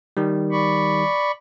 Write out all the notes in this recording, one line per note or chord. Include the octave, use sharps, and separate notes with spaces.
D#3 G3
D5 B5 C#6